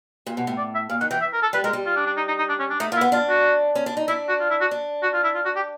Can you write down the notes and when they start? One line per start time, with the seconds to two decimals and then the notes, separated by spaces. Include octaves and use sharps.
0.27 A#2
0.37 B2
0.47 A2
0.57 D5
0.74 E5
0.90 A#2 F5
1.00 D#3 F#5
1.11 E3 G5
1.21 E5
1.33 A#4
1.42 A4
1.53 G3 B4
1.64 G#3 A#4
1.73 G3
1.86 F4
1.96 D4
2.06 D4
2.17 D#4
2.28 D#4
2.38 D#4
2.49 D4
2.60 C#4
2.70 D4
2.80 A3 D#4
2.92 A#3 F4
2.96 E4
3.01 B3
3.12 D4 F4
3.29 F#4
3.75 C#4
3.86 D4
3.97 D#4
4.08 D4 E4
4.29 F#4
4.40 F4
4.50 E4
4.61 F#4
4.71 D4
5.03 F#4
5.14 F4
5.24 E4
5.35 F4
5.45 F#4
5.56 G4